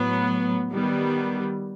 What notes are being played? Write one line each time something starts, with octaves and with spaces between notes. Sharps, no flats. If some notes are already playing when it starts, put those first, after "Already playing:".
Already playing: A2 F#3 B3
D#3 G3 B3